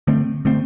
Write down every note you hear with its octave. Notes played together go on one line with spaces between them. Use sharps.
D3 A3 C4
D3 A3 C4